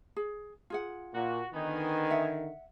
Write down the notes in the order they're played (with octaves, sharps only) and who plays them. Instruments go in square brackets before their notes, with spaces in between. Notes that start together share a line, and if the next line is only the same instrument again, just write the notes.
[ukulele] G#4
F4 G#4 F#5
[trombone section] A#2 [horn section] F#4
[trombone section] D3 D#3 [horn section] B3 D#4 G#5
[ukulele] E5 F#5